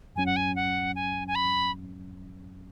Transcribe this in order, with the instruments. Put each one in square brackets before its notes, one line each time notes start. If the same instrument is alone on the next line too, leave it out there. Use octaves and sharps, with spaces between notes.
[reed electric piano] F#2 F#3 C#4 [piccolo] G#5
[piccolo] F#5
G#5
F#5
G#5
G#5
B5